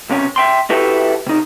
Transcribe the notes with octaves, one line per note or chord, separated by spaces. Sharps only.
B1 C3 C#4
E5 G5 C6
E4 F#4 G4 A4 B4 E5
C3 D#4